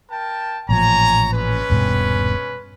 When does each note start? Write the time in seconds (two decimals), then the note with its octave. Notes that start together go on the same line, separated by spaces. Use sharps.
0.10 A#4 G5 A5
0.69 A1 A#2 F3 C#5 G#5 A#5
1.33 G#3 C#4 B4
1.70 D#1 G2 B2